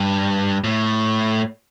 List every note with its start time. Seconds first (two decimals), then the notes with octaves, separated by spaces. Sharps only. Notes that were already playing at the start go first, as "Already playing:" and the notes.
Already playing: G2
0.64 A2